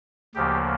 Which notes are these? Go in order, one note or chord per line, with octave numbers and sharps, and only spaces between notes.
D2 C#3 F3 A#3 G4